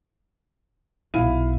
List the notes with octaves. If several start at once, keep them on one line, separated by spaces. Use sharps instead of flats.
B1 B2 E4 F5 D#7